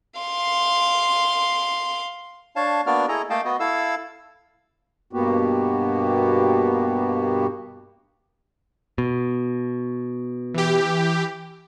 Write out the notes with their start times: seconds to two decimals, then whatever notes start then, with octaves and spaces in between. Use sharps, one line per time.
0.20 F5 C6
2.56 D4 C#5 F5 A5
2.86 A#3 B3 D4 F#4 D5 F6
3.08 E4 G#4 A4 D#5 A#5
3.30 A3 A#3 D#5 F5 G5 A5
3.45 B3 F#4 D#5
3.60 E4 A4 F5 E6
5.13 G2 B2 A#3 B3 F#4 G4
8.98 B2
10.54 E3 G4